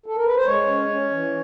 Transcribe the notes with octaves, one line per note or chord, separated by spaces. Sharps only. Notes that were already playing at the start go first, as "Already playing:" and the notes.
A4
A#4
B4
C5
G#3 C#5
C#4
C#4
E3